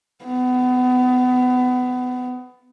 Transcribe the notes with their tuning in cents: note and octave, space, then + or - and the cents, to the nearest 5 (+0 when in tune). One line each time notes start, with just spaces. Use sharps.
B3 +25